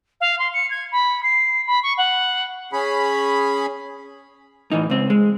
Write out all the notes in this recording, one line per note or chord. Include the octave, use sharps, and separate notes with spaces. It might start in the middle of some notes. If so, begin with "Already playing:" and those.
F5
C6
C#7
G#6
B5
C7
B5
C#6
F#5
C#4 G#4 B5
A2 E3 D#4
C#2 C4
G#3